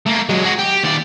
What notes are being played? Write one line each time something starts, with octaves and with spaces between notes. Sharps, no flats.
A3 A#3
F#3 G#3
F#4 G#4
G4
D#2 D5